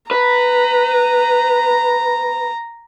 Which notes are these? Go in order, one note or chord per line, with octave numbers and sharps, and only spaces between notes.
B4 A#5